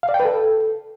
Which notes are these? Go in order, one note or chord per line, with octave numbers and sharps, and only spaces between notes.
F5
D5
G5
B4
A4